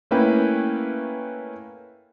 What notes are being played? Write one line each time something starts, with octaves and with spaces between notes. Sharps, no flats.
A3 A#3 C#4 E4 B4 G5